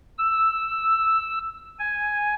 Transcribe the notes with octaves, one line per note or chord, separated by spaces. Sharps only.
E6
G#5